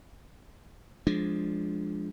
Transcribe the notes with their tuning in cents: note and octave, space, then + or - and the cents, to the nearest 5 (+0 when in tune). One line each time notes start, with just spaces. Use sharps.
F3 +0 G#3 +0 D4 +0